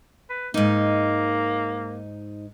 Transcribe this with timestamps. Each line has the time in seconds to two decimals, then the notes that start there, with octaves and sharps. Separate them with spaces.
0.30 B4
0.54 G#2 A#3 D#4